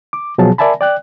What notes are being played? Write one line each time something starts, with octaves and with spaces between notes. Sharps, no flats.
D6
B2 F3 F#3 G#4 A5
A#4 D5 E5 G#5 A5 B5
D5 G5 F#6